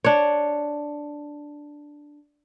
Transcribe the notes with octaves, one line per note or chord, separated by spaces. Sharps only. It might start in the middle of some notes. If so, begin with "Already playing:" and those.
D4 C#5